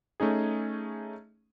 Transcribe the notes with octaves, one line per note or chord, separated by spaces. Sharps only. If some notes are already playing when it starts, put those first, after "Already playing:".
A3 C#4 D#4 G#4